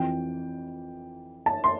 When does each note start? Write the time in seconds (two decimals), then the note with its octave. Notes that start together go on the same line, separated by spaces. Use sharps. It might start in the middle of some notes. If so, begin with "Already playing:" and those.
Already playing: F2 E3 G5
1.46 A5
1.64 C6